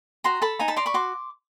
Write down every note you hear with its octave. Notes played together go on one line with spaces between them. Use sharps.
F#4 A#5 C6
A4 A5 B5
D#4 G#5 A#5
A5 B5
D5 A#5 C6
B5 C#6
F#4 C6 D6